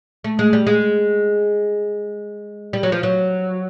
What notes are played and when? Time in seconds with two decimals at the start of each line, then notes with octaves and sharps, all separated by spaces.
0.24 A3
0.39 G#3
0.53 G3
0.67 G#3
2.73 G3
2.83 F#3
2.92 F3
3.03 F#3